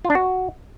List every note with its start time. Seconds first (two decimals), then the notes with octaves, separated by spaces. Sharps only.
0.05 F4
0.10 D4
0.15 F#4